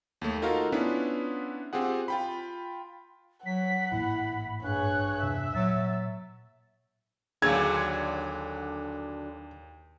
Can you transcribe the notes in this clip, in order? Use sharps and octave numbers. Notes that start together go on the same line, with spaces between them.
D#2 A3
D#4 F4 F#4 A4 A#4 F5
B3 C#4 D4 E4 F4 B4
C4 F4 G4 G#4 F#5
F4 G5 B5
F#3 F#5 B6
A1 G#2 A#3 E4 B5
G2 G#4 C#5 F#6
E2 C3 E5
A#2 F#3 A6
D#2 D3 F#3 G#4 F5 G#5 G#6